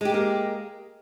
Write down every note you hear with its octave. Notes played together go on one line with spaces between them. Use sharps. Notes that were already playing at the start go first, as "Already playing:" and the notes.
G#3 A#3 G4 A#4